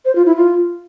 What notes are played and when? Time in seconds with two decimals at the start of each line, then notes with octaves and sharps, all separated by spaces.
0.05 C5
0.15 F4
0.26 E4
0.36 F4